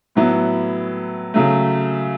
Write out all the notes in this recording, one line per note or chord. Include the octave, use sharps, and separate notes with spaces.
A2 F#3 B3 E4
C#3 F#3 A3